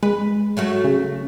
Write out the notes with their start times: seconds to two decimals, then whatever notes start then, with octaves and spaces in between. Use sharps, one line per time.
0.03 G#3 B4
0.57 F#3 A3 F#4
0.84 C#3